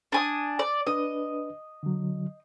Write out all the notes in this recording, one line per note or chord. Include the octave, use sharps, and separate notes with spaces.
D4 G#5 D#6
D5
D4 B4 D#5
D3 F#3